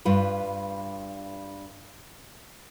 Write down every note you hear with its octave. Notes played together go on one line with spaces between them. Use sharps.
G2 F4 B4